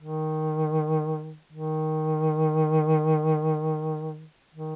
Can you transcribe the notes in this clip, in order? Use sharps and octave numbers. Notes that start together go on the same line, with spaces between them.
D#3
D#3
D#3